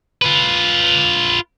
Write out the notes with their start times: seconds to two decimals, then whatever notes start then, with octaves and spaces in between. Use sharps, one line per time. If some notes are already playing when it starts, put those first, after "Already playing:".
0.22 F4 B4